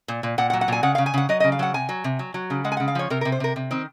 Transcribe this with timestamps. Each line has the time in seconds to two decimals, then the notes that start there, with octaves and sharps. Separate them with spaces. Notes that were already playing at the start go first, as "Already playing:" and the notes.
0.08 A#2
0.23 A#2
0.38 A#2 F#5
0.50 F#5
0.53 F#3
0.61 F#5
0.68 A#2 G#5
0.83 C#3 F#5
0.95 F5
0.98 C#3
1.06 G#5
1.14 C#3 F#5
1.29 F#3 D#5
1.40 D#5
1.44 C#3
1.52 F5
1.59 F#3 F#5
1.74 C3 G#5
1.89 F#3
2.04 C3
2.19 F#3
2.34 F#3
2.50 C#3
2.64 G#3 F#5
2.72 G#5
2.77 F#5
2.80 C#3
2.88 F5
2.95 F3 C#5
3.10 C3 A#4
3.21 A#4
3.25 C3
3.32 C5
3.40 C3 A#4
3.56 C3
3.71 D#3 C4